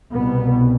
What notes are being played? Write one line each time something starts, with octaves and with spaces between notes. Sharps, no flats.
C2 B2 B3